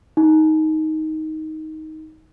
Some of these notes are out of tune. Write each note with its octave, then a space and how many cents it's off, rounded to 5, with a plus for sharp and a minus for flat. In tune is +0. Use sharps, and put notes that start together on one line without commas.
D#4 +10